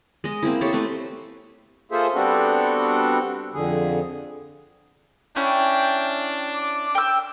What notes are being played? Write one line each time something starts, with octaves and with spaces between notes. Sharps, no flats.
G#3 D#5
A#3 C4 E4
G4 A4 C5 C#5
A3 C4 A4 B4
A#3 F4 G#4 A4 C5 E5
G3 B3 C4 D4 F#4 A4
F2 D3 G#4
C#4 D4 E4 G5
D6
G5 E6